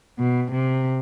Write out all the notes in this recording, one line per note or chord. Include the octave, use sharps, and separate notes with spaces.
B2
C3